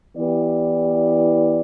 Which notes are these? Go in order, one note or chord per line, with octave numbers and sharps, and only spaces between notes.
E3 B3 E4 G4 D5